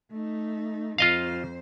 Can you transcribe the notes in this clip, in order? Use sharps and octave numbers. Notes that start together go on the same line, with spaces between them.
A3 D#4
F2 F4 C5 D#5 F5